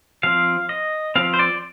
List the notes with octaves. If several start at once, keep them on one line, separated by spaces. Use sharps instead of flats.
F3 C4 F5
D#5
F3 C4 F5
C5
D5